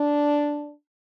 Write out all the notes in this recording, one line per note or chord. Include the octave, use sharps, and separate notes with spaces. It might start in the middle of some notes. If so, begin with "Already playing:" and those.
Already playing: D4